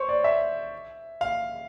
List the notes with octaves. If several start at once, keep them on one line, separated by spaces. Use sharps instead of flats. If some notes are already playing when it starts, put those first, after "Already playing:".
Already playing: C5 C#5
D5
E5
F5